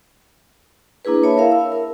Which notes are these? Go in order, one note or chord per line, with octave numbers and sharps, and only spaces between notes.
A#3 D4 E4 G#4 B4
C#5 E5 A5 B5
E4 A#4 E5 F5
E6
A#4